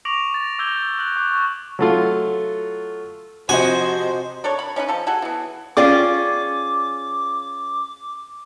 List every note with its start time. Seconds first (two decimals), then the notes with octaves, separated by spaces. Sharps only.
0.05 C#6 D6 A#6 D7 F7 F#7
0.34 A6
0.59 D6 E6 G6 G#6 A#6 G7
0.99 F#6 A#6 F#7
1.16 C#6 D6 F#6
1.31 C#6
1.79 F#3 A3 F4
3.49 C3 F3 F#4 C5 D#5 G#5
4.44 D4 A4 A#4 C#5
4.59 B5
4.76 C#4 D#4 A4 B4
4.88 F3 A4
5.07 F#4 G#4 A4
5.22 E3 B3
5.77 C#4 F4 G#4 D5 G5 D6